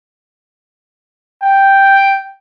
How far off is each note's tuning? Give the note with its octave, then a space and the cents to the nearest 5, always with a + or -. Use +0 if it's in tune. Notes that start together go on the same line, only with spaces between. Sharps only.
G5 +0